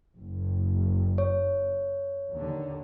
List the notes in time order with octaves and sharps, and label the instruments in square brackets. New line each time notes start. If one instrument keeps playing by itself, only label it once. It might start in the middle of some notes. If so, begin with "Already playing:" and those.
[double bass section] F#1
[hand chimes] C#5
[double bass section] D#2 D3